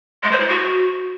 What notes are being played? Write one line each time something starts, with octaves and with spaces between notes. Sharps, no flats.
G#3
C5
E4
F#4